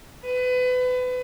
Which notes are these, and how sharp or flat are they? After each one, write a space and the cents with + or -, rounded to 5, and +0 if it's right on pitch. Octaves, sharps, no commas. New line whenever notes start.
B4 +30